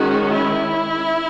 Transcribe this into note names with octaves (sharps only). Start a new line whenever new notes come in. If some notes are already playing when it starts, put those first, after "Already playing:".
Already playing: D#3 G#3 C#4 F#4
E4